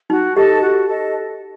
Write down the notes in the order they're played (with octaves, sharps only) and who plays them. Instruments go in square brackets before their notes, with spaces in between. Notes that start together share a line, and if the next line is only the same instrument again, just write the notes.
[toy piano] D#4 [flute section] F#4
[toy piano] G4 [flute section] A4 D#5 A5
[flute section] F#4
A4 D#5 A5